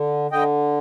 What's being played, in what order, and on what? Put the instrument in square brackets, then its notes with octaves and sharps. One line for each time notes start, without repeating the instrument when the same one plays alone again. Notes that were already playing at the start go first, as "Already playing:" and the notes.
Already playing: [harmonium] D3
D3 D#5 G5